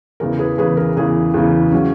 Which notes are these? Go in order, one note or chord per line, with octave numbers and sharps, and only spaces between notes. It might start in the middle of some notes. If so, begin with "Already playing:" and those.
E2 C#3 E3 A#4
G#4 B4
E2 C#3 E3 G#4 B4
A#4
E2 C#3 E3 G#4
E2 C#3 E3
C#3 F#3 C#4